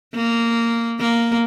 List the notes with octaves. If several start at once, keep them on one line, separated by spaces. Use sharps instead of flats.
A#3
A#3